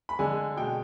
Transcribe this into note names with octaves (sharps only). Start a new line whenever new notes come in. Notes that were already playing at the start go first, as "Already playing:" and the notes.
B5
D3 G#3 G#5
B2 G#3 G5